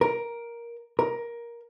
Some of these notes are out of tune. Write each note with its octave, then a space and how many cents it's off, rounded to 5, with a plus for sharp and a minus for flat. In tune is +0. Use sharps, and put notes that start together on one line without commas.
A#4 +10
A#4 +15